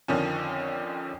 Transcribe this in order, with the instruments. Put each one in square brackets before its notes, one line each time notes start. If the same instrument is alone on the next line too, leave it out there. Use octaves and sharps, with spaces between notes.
[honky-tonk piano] F2 D3 D#3 F3 C#4